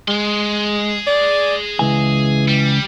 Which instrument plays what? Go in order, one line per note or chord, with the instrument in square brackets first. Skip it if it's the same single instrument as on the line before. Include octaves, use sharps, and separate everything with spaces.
[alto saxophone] G#3 [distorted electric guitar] G#4 C6
[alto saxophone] D5
[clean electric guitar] C#2 G#5 [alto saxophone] E3
[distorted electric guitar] G3